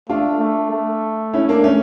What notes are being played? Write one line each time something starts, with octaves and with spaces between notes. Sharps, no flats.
A3 D4 F4
A3
A3
C#4 E4
A#3 D4
A3 C#4